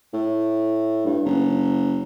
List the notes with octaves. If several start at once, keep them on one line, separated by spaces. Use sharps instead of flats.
A2
G2
F#1